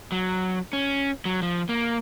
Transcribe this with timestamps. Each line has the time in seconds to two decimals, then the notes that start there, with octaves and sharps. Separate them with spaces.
0.12 F#3
0.73 C#4
1.25 F#3
1.42 F3
1.69 A#3